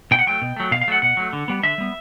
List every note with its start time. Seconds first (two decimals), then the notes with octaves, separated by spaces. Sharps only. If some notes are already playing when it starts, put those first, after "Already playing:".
0.11 B2 G5
0.19 F#5
0.27 F#3 A3 G5
0.42 B2
0.56 F#3 A3
0.71 B2 F5
0.82 F5
0.88 F#3 A3 F#5
1.02 B2 F#5
1.17 F#3 A3
1.33 D3
1.48 G3 B3
1.63 D3 E5
1.78 G3 B3